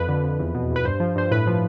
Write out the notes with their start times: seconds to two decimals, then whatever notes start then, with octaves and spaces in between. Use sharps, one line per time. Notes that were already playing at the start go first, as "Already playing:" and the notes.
Already playing: F2 B4
0.08 D3
0.24 F2
0.40 E2
0.55 B2
0.71 E2
0.76 B4
0.85 G2 C5
1.00 F3
1.16 G2 C5
1.31 A2 B4
1.47 F3